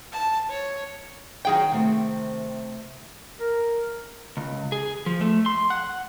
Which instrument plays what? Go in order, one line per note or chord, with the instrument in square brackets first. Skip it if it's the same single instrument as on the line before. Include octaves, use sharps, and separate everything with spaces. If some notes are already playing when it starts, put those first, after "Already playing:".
[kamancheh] A5
C#5
[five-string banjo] D#3 G#4 G5 [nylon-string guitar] F#3 F#5
[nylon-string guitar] C3 A3 C4
[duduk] A#4
[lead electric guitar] C#2
G#4
F3
A3
C6
F#5